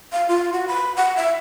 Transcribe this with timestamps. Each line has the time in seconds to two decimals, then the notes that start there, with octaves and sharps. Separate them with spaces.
0.13 F5
0.28 F4
0.53 F#4
0.68 B5
0.96 F#5
1.16 E5